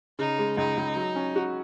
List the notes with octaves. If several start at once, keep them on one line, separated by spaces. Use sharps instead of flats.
C#3 D#4
G#3
C#2 D#4
C#2
F#3
C#4
F#4